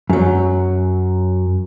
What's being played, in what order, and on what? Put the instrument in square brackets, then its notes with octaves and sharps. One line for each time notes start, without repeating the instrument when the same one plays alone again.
[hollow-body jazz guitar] F#2 F#3